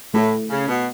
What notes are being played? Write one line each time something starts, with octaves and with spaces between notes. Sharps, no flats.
A2 A3 E4 A4
C#3
B2